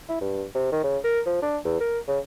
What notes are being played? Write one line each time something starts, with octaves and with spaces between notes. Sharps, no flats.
E4
G2
C3
D#3
C#3
A#4
F3
D4
E2
A#4
C#3